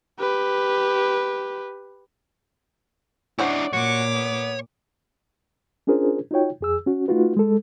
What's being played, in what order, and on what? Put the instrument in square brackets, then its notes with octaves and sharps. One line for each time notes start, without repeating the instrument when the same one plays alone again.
[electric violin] G4 B4
[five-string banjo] C#4 C5 F#5 [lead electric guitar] D4 E4 [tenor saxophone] D5
[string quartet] A#2 D6 [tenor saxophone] F#4 [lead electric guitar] C#5
[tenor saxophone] B3
[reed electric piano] C#4 D4 F4 G#4 A#4 C5
D#4 F4 F#4 C#5 G5
F2 G#4 E6
C#4 F#4
A3 D#4 F4 F#4 B4
G#3 A4